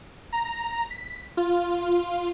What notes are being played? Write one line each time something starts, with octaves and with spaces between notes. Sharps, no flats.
A#5
B6
F4